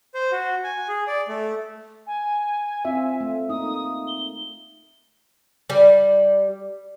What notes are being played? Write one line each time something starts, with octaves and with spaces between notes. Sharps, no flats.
C5
F#4
G#5
G#4
D5
A3
G#5
C4 F4 E5
A3
A#3 D#4 D#6
G7
G3